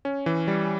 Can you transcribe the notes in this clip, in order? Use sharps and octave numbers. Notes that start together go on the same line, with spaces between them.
C#4
E3
G3